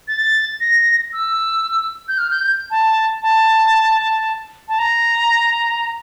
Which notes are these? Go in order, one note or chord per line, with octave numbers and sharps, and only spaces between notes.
A6
A#6
E6
G6
F6
G6
G6
A5
A5
A5
A#5